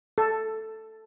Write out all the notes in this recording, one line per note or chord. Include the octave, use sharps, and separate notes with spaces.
A4